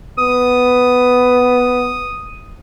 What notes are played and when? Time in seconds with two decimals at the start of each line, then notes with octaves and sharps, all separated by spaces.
0.18 B3 D#6